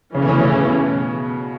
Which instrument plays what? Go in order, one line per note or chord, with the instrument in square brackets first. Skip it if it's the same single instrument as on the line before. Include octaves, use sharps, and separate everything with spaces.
[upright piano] C#3 [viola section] E3 A3 C#4 G#4
[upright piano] B2
C#3
C#3
B2